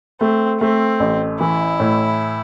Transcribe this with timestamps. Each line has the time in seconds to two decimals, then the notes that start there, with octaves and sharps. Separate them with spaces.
0.21 A3 C4
0.60 A3 C4
1.00 A1
1.40 E3 E4
1.80 A2